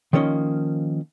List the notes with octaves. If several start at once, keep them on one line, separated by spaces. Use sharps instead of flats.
D#3 F3 A#3 C#4 D#5